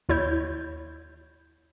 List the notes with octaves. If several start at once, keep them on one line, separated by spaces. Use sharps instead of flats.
D#2 E4 C#5 G6